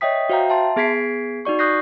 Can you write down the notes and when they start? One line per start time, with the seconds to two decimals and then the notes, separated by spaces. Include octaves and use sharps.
0.01 C#5 D#5 E5 G5 D#6 B6
0.29 F#4 C5 E5 F5 G5 A#5
0.50 E5 A5 C6
0.76 B3 G#4 G#6 B6 C7 D7
1.45 D#4 F#4 D5 C#6
1.59 C#6 D#6 F#6 G6 A#6 C7